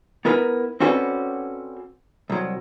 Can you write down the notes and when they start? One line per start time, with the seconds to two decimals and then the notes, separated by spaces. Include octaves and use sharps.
0.25 B3 E4 A#4 B4
0.80 C4 C#4 F#4 A4 B4 D5
2.30 C2 F#3